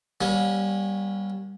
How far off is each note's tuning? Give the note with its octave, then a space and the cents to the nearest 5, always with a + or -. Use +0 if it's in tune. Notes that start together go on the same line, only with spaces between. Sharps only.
G3 +0 A#3 +45 C#4 -10